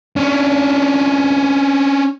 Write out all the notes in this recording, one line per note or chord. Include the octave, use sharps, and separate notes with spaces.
C#4 D4